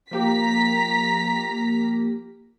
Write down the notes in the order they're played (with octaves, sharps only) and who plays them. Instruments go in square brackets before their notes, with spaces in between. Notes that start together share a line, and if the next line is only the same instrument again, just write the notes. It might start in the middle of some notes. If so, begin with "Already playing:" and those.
[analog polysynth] F3 A#3 G4 [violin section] A#5 B6